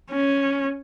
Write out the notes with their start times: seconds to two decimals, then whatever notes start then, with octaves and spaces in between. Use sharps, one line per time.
0.10 C#4